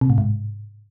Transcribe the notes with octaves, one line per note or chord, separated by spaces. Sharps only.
C3
A2
G#2